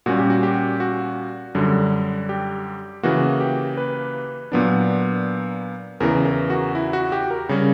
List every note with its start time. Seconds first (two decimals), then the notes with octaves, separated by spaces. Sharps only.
0.06 A#2 G3 C#4 F#4
0.18 G4
0.30 F#4
0.43 G4
0.80 F#4
1.55 F#2 D3 G3
2.29 G4
3.03 C#3 E3 A#3 F#4
3.40 G4
3.77 B4
4.52 A#2 F#3 B3 D4
6.00 E2 C#3 E3 A#4
6.25 A#4
6.50 F#4
6.75 E4
6.93 F#4
7.12 G4
7.31 A#4
7.49 C#3 G3 C#4